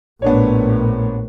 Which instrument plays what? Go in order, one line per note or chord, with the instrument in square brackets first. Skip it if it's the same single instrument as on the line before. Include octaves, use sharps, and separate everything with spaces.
[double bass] A#1 A2 [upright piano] B3 D4 C#5